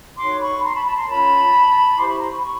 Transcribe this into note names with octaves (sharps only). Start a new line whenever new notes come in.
D#4 F#4 A4 C#5 C6 D6
B5 C#6
A#5 C6
A5 B5
A5 B5
A#5 C6
C#4 F4 A#4 C#5 A5 B5
E4 G4 C5 C6 D6
B5 C#6
A#5 C6
B5 C#6
B5 C#6